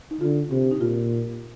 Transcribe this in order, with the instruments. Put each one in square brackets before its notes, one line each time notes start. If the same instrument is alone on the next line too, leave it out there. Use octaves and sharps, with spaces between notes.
[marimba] D#4
[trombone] D3 [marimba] F4
[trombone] C3 [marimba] G4
[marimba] D#4
[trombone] A#2 [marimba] F4